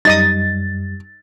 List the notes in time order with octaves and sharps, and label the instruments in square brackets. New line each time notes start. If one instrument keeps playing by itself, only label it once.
[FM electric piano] F#2 G3 [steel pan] D#4 D#5 D#6 [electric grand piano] A6